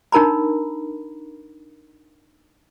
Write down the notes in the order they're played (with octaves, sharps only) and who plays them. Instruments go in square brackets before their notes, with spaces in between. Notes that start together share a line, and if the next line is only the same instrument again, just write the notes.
[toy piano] D4 D#4 A#4 A#5 B5